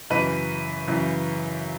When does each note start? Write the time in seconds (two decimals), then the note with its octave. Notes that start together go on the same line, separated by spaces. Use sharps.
0.10 F#2 C#3 E3 B4
0.88 F#2 C#3 E3